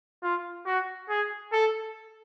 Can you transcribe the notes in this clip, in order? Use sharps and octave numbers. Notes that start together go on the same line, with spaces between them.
F4
F#4
G#4
A4